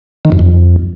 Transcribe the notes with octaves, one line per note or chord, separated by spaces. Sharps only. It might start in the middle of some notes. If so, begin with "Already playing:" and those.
D#3
F#2
F2